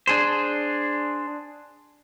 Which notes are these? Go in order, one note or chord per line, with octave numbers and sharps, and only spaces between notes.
D4 G#4 C5